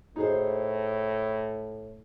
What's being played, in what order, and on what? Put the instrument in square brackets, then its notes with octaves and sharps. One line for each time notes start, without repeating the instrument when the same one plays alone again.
[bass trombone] A2 [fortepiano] D#4 G#4 C5